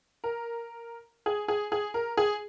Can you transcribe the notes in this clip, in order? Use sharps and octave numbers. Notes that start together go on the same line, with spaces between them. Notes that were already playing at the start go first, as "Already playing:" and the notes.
A#4
G#4
G#4
G#4
A#4
G#4